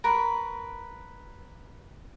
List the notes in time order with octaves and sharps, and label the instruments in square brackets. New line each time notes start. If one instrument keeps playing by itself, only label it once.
[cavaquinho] A#4 B4 C#6